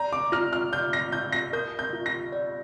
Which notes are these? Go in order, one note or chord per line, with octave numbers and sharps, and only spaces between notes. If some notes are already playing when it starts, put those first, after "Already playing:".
Already playing: D5 A#5
D6
F4 F6
F6
D5 G6
A#6
F4 G6
A#6
A#4 G6
G6
F4
A#6
D5